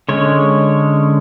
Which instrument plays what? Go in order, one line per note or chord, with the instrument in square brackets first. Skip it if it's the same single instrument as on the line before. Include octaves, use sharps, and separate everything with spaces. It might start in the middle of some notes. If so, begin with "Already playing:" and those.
[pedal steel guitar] D3 G#3 C#4 C#5